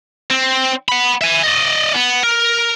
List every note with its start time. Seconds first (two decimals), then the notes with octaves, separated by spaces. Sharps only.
0.31 C4
0.88 F#5 B5
1.21 E5 G#5
1.43 D5 D#5
1.94 B3
2.23 A#4